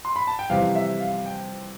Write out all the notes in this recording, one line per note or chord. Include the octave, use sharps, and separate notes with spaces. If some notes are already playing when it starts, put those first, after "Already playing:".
C6
B5
A5
G5
F2 C3 E3 G3 F5
E5
F5
G5